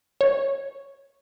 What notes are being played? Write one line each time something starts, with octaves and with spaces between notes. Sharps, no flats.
C#5